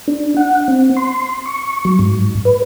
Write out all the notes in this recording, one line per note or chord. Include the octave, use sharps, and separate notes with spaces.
D4
F#5
C4
C6
C#6
F#3
G#2
B4